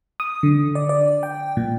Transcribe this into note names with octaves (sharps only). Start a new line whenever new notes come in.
D#6
D3
D5
D5
G5
A#2